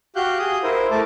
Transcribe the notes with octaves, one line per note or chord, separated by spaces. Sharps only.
F#4 G4 F5 F#6 G6
G#4 D#6
E4 A#4 C5
A3 A#4 A5 D6